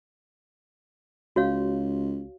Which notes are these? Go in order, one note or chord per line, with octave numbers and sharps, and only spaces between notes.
C#2 F#4 C#5 F5